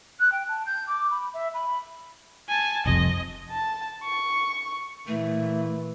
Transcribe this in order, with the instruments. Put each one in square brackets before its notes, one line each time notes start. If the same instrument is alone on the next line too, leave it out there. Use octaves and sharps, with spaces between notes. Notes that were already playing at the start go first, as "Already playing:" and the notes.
[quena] F#6
G5
A5
G6
D6
B5
E5
B5
[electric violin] G#5 A5
[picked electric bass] F1 C2 F2 [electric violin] D#5
[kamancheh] A5
C#6
[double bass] A#2 E3 [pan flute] A3